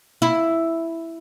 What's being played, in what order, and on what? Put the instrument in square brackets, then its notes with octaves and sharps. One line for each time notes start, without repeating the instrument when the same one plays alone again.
[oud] E4